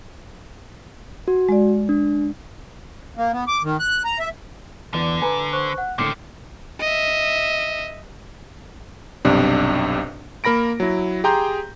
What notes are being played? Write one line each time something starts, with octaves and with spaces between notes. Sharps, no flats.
F#4
G#3 D5
D4
A#3
B3
D6
D#3
F#6
A#5
E5
E2 D3 E3 D5
B4 G#5 A#5
C5 C#6 F#6
F#5 F#6
A2 D3 D#3 A3 C4 D6 C7 C#7
D#5 E5
B1 G2 C3 D4
A#3 A#4 B5 A#6 D7
F#3 E4
G4 G#4 G5 A#5 C6 G6